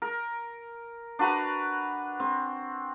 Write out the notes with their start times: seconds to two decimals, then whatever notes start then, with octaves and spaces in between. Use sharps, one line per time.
0.02 A#4
1.19 D4 F#4 B4 A#5
2.20 C4